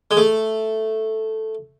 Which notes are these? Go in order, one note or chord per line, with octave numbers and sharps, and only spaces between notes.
G#3
A3